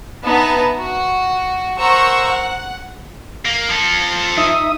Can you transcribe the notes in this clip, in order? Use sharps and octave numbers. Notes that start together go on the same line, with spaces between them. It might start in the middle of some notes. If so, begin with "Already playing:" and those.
B3 D#4 E5 A5
F#4
A#4 C5 F#5 A#5 C#6 E6
F#5
A#3
F3 A4
D#4 E5 D#6